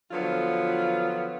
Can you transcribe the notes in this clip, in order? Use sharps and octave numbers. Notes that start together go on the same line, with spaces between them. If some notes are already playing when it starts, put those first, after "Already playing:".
D3 F3 F#3 B3 F4